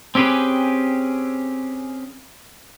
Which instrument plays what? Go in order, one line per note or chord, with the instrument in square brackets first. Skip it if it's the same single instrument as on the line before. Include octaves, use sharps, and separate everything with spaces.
[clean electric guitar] C4 C#4 G4 G#4 B4